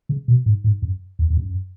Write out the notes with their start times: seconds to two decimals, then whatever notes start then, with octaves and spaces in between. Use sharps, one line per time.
0.09 C#3
0.28 B2
0.46 G#2
0.64 G#2
0.82 F#2
1.19 E2
1.30 E2
1.37 F#2